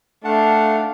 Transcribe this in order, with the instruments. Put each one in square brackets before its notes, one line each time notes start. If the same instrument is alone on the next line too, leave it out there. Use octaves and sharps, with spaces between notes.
[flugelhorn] A3 [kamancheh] D4 F5 [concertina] F#5 A5